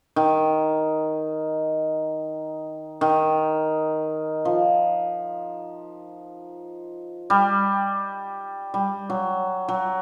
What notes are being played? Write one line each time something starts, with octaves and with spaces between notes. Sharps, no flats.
D#3
D#3
F3
G3
G3
F#3
F#3